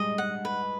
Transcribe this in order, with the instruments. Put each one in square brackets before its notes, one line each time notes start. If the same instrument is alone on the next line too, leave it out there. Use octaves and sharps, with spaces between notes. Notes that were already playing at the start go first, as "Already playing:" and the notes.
Already playing: [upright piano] G3 G#3 [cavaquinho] D#5
[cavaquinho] F#5
B4